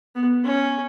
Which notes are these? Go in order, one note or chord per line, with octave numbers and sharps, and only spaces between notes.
B3
C#4